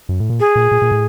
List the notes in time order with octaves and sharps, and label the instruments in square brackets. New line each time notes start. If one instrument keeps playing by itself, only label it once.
[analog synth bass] F#2
A2
A#2
[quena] G#4
[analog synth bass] A#2
A#2
A#2
A2